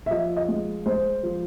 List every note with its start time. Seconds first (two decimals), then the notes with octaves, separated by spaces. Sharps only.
0.06 E5
0.11 F3 D#5
0.37 D#5
0.48 G#3
0.86 G#3 C5
1.23 F3